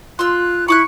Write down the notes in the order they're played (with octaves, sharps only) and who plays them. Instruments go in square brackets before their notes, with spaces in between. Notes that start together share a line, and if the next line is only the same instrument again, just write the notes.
[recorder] F4 [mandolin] C6 E6 [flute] F#6
[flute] E4 [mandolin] B5 D6 F#6 [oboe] C#6